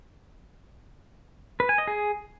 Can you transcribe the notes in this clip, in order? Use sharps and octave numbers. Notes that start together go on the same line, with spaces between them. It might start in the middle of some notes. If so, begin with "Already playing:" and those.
B4
G#5
D#5
G#4